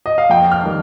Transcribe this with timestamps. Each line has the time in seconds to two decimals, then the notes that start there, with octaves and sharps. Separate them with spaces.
0.06 D#5
0.18 F5
0.30 F2 G5
0.52 F6
0.64 D#3 G3